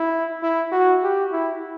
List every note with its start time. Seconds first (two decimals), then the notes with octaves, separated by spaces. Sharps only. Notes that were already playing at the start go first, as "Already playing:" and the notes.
Already playing: E4
0.43 E4
0.72 F#4
1.03 G4
1.32 E4